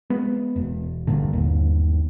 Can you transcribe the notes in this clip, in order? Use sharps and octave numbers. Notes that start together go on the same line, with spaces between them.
G#3 B3
E1
G1 G2 A#2 D3
G1 D#2